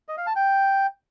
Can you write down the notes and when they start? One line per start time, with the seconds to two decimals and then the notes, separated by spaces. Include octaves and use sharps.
0.09 D#5
0.18 F5
0.27 A5
0.36 G5